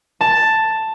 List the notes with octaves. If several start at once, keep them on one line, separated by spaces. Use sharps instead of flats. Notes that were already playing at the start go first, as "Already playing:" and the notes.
A5